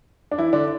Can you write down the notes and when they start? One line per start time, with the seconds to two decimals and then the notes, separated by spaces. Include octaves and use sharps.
0.31 D4
0.38 E3 E4
0.53 D3 D4